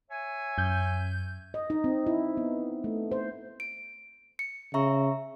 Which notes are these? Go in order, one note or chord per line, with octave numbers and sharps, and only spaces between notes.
C#5 E5 G#5
F#2 G6
D#5
D#4
C4
E4
B3
A3
C5
D7
C#7
C#3 E5 A#5 C#6